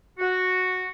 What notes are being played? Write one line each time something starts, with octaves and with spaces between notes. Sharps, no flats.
F#4